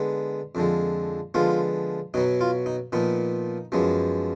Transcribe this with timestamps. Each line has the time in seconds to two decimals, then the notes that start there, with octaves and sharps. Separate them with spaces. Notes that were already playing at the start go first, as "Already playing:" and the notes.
Already playing: D3 G#3 B3
0.55 F2 D3 F3 G#3
1.34 D3 F3 G#3 B3 F4
2.14 B2 F#3 B3 D#4
2.41 F4
2.66 D#4
2.92 A#2 F3 B3 D#4
3.72 F#2 F3 G#3 B3